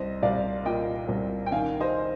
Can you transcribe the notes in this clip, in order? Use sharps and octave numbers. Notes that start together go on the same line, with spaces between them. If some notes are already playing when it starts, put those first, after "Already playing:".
Already playing: C2 C5 D#5
C2 D5 F5
A#2 D#5 G5
C2
G5
D#3 F5 G#5
C5 D#5